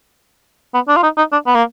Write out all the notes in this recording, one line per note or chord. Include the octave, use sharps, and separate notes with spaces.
B3
D4
F4
D#4
D#4
D4
B3
A#3